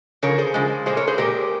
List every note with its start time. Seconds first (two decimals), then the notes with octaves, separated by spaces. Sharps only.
0.23 C#3 F3 A#4 C#5
0.38 G#4 C5
0.54 C#3 F3 G#3
0.86 A#2 G#3 G#4 C5
0.97 A#4 C#5
1.07 G#4 C5
1.18 A#2 G#3 G4 A#4